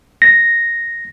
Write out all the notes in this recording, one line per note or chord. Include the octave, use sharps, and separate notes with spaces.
A#6